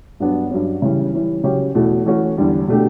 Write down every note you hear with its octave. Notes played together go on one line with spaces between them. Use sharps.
G2 F#3 B3 D4
G2 F#3 C#4
C#3 E3 G3 C#4 E4
E3 G3 C#4 E4
C#3 F#3 C#4 G4 C#5
E2 B2 A3 E4
E3 A3 C#4 F#4
E2 D3 G3
B2 A3 D4 G4